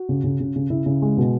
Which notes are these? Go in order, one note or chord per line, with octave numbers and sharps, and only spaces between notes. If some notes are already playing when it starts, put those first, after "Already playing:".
Already playing: F#4
C#3
C#3
C#3
C#3
C#3 E4
C#3
G#3
B2